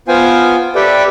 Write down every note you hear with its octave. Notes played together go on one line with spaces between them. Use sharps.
B3 F4 C5 F5 G5 G#5
G4 A4 B4 D5 E5 G5